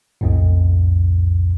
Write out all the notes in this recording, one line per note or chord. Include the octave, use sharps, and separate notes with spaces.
B1 F2 A2